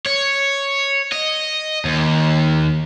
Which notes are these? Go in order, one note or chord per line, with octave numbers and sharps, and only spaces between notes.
C#5
D#5
D#2